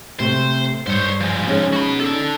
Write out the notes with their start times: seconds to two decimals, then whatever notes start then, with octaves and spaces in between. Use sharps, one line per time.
0.20 C3 A3 C5
0.87 G2 C5 C#5
1.21 F3 G#3
1.47 C#4 D#4 G#4
1.73 F#4 B5
2.00 D4 A4